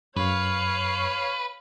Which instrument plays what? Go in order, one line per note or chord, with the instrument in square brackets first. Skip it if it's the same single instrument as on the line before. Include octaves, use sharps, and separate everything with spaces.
[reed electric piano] F#2 [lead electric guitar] B4 [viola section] C#5 F5